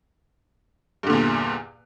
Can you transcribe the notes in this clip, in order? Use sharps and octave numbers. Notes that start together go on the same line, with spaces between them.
E2 G2 A#2 D3